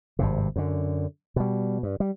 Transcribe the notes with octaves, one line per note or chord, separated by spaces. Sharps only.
G#1 G2 C3
F#2 D3
B2 G3
G2
G3